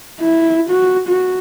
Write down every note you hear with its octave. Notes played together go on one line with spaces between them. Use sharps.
E4
F#4
F#4